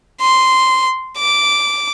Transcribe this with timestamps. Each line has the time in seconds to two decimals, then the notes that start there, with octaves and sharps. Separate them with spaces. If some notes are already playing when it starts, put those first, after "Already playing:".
0.21 C6
1.18 D6